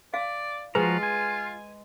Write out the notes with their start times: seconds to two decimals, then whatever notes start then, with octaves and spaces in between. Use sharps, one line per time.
0.14 D5 F5
0.75 F3 G#3 F4 F#4 B4 A#5
1.03 G#5